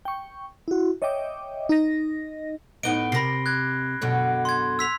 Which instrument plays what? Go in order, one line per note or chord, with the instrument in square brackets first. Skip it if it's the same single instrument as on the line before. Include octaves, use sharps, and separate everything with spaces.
[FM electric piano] G5 C#6
E4 F#4
C#5 D#5 E5 G5 D6
D#4 D#5 A#6
[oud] A2 B3 D#4 [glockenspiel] D7 G7
[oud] C3 A#4 [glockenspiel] B5 A#6 C7
[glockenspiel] F#6 G#6
[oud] F#2 B2 D3
[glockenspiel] C6 G#6
E6 B6 F7